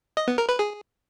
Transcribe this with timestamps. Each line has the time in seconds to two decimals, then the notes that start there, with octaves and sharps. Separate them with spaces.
0.17 D#5
0.28 B3
0.38 A#4
0.49 B4
0.59 G#4